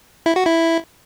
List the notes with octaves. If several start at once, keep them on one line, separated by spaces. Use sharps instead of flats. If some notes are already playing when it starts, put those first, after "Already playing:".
E4
F#4
E4